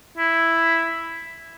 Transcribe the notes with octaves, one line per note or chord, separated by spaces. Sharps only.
E4